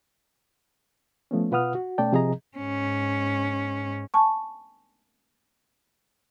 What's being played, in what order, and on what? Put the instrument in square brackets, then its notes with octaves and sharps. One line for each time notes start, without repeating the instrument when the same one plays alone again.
[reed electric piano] F3 A3 B3 C#4
B2 F4 B4 F#5 D#6 F6
F#4
B2 A3 C#4 D5 G5 A5
C3 F3 G#4 D#5 A#5
[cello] G#2 C#4
[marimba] G#5 A5 C#6